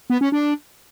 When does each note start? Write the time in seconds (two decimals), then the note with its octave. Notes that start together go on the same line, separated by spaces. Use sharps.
0.10 B3
0.21 C#4
0.32 D4